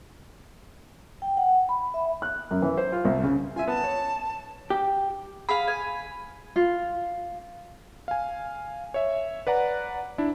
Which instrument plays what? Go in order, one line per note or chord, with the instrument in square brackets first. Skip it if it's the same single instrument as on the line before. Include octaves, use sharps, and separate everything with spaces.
[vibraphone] G5
F#5
B5
E5
[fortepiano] F#6
F#2
E3
C5
F4
C2
C#3
[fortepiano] F4 E5 [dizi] G#5
[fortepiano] B3 [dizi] A5
[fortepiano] C#5
[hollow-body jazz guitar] G4
[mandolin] G#4 F5 [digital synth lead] B5
[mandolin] G#5
[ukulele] F4
[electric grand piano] F5 G#5
C#5 E5
B4 D5 F#5 A#5
D4 E4